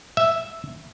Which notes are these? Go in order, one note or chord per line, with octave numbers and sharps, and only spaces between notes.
E5